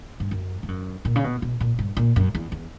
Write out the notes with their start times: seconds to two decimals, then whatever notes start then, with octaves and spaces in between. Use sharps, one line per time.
0.20 G2
0.31 F#2
0.63 G2
0.68 F#2
1.05 A#2
1.16 C#3
1.24 B2
1.42 B2
1.60 A#2
1.79 G2
1.97 A#2
2.16 F#2
2.35 E2
2.52 E2